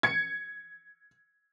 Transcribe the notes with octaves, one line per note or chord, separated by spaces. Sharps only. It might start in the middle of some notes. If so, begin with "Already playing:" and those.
G#6 C#7